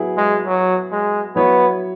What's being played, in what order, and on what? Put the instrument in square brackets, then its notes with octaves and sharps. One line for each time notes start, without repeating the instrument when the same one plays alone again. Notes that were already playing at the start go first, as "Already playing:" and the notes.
Already playing: [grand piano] F#3 B3 E4 G#4
[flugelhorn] G#3
F#3
G#3
[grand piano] F#3 E4 C#5 [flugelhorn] B3